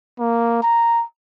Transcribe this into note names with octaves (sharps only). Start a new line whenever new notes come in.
A#3
A#5